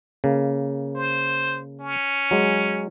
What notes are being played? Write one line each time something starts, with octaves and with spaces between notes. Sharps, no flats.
C#3 A#3
C5
C#4
F#3 G#3